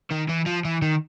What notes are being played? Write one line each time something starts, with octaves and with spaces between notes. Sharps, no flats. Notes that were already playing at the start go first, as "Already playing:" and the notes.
D#3
E3
F3
E3
D#3